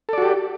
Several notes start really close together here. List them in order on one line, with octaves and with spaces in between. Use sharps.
A4 D5 F#4 G4